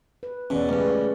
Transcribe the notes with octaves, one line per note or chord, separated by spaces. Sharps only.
B4
E2 B2 C#4 D5
C#2 G2 A3 G#4 B4